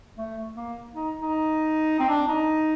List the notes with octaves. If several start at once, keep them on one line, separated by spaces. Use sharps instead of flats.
A3
A#3
D#4
D#4
C4
D4
D#4